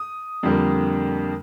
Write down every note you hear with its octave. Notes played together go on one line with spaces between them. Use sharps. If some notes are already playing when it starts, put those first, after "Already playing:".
Already playing: D#6
F2 D3 G3 A#3